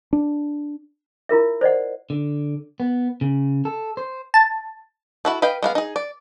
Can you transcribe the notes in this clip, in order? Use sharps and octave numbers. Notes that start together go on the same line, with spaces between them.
D4
E4 F4 A#4 E5
C5 D5 D#5 F#5
D3
B3
C#3
A4
C5
A5
E4 F#4 A4
B4 D#5 F5 G5
G#3 B3 F5
D#4 G#4
D5